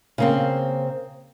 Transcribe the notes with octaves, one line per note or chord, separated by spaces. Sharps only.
C#3 A#3 C4